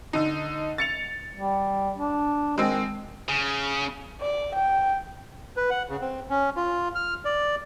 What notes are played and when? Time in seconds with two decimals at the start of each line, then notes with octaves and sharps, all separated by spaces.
0.13 D3 D#4
0.78 A6 C#7 F7
1.36 G3
1.96 D4
2.58 D#3 G#3 C4
3.29 C#3
4.21 D5
4.55 G5
5.57 B4
5.70 F#5
5.89 C#3
6.01 C4
6.30 C#4
6.57 F4
6.95 F6
7.25 D5